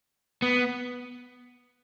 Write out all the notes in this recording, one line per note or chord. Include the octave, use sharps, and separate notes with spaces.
B3